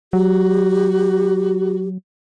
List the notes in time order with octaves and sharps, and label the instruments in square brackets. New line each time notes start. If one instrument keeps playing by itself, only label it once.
[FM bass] F#3 [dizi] F#4 [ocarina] G4